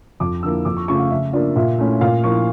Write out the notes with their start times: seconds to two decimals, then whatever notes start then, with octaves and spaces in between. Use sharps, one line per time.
0.20 F2 D6
0.43 D3 F3 A#3 E4 E6
0.65 F2 D6
0.77 C#6
0.88 C#3 F3 A3 C#6
0.99 F5
1.11 C#3 E5
1.33 F3 A#3 D4 F4 D5
1.56 A#2 E5
1.79 A3 C#4 E4
2.01 A#2 F5
2.24 F3 A#3 E4 C#6